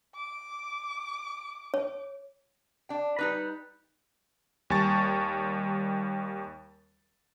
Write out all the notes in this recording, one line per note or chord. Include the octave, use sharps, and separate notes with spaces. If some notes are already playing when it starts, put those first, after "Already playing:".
D6
C#5
D4 G5
G3 D#4 B4
D#2 G3 G#5 A5 C#6 A6